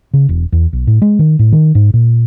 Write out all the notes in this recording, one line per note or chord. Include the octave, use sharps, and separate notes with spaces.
C#3
E1
E2
B1
A2
G#3
D#3
A2
D#3
G#2
A#2